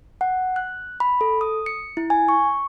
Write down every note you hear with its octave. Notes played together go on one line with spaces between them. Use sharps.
F#5
F#6
B5
A4
D#6
C#7
E4
G#5
C#6